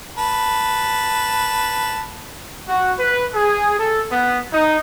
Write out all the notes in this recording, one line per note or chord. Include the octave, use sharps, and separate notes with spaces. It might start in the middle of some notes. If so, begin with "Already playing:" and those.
B4 A5
F#4
B4
G#4
A4
B3
D#4